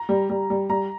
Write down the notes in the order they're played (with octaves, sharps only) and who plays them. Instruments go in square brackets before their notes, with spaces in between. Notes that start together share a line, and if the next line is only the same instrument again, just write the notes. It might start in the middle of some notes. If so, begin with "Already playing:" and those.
Already playing: [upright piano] A#5
[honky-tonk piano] G3
G3
G3
[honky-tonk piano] G3 [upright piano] A#5